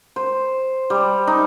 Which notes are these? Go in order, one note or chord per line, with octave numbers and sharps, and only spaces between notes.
C5
G3
D#4